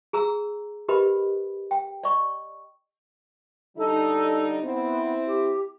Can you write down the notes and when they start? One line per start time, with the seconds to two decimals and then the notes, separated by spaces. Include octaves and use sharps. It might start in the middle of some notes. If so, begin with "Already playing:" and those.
0.13 G#4 A#5 E6
0.88 G4 A#4 B4 D#5 B5
1.71 G5
2.04 D5 D#5 C#6
3.77 D3 G3 D#4 A4
4.63 B3 C4 E4
5.26 G4